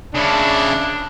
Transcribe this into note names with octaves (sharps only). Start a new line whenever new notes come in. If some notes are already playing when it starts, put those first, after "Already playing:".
C#3 D4 E4